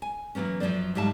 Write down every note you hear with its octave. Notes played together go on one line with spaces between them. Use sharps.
G#5
E3 F#3 A#3 B3 C#4
F#2 F3 F#3 C4 C5 D5
G#2 F#3 G3 E5 F5 A5